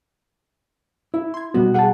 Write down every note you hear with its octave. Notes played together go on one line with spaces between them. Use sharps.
E4
C6 G#6
B2 G3 B3 F#4
G3 G#4 F#5 G5 A5